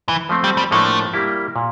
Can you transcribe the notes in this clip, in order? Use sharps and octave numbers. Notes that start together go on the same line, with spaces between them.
E3
F3 A3 C4
G3
G3
A2 F3 A3 A#3 D4 A4
G3 A#3 E4 G4
A#2